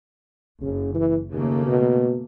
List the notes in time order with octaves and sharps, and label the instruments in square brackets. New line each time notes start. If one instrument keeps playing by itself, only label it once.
[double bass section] F#1 [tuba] C#3
[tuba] E3
[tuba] D#2 [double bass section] C#3 A3 A#3
[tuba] B2